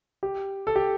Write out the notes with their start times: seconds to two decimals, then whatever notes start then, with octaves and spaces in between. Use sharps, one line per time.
0.23 G4
0.67 A4
0.76 G4